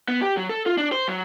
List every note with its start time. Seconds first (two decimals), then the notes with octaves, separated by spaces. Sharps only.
0.08 B3
0.22 G4
0.37 F#3
0.49 A4
0.66 F4
0.78 D4
0.92 C5
1.08 F#3